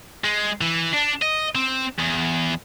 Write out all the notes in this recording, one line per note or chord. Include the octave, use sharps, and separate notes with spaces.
G#3
E3
D4
D#5
C4
E2